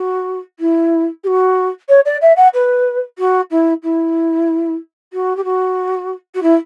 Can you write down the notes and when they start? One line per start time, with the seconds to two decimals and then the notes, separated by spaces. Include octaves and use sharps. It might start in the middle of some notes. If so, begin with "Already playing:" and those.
Already playing: F#4
0.59 E4
1.23 G4
1.27 F#4
1.88 C#5
2.05 D5
2.21 E5
2.36 F#5
2.53 B4
3.18 F#4
3.50 E4
3.82 E4
5.13 F#4
5.36 G4
5.44 F#4
6.34 F#4
6.42 E4